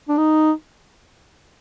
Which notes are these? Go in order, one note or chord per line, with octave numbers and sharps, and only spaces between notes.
D4
D#4